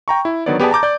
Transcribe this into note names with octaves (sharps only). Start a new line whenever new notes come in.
G5 A#5 C#6
E4
D3 D#3 F#3 B3 C#5 D5
B3 G4 G#4 D5 A5
A5 A#5 D6 G6
D5 G6